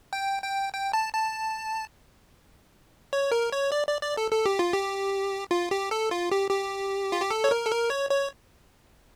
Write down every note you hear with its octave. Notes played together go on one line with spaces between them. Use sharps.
G5
G5
G5
A5
A5
C#5
A#4
C#5
D5
D5
D5
A4
A4
G4
F4
G4
F4
G4
A4
F4
G4
G4
F4
G4
A4
C#5
A#4
A4
A#4
C#5
C#5